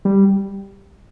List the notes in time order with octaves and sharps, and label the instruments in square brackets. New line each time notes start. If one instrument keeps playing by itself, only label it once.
[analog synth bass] G3